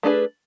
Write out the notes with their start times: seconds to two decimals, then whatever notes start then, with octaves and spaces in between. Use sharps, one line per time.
0.03 A3 D4 G#4 B4